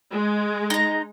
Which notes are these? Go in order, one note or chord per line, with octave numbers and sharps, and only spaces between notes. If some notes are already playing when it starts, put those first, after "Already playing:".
G#3
D#4 A#5